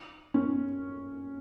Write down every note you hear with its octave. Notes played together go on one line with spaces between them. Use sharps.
C#4